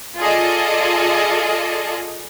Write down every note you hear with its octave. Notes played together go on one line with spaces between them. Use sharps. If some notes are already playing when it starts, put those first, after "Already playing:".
F4 G#4 A4 D5 D#5